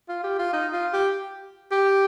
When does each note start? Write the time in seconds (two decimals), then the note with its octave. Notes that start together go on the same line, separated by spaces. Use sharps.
0.09 F4
0.24 G4
0.39 F4
0.53 D#4
0.73 F4
0.93 G4
1.71 G4